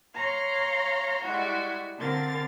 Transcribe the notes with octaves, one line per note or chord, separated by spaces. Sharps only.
C#5 F5 A#5 C6
G3 G#3 E4 F#4
D3 C4 A#4 F5 A6